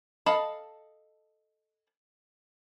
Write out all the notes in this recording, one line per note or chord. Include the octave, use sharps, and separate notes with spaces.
A4 D#5 F5 A5 B5